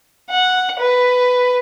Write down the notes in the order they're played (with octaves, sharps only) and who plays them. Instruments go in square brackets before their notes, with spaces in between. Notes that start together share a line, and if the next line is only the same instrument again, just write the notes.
[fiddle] F#5
B4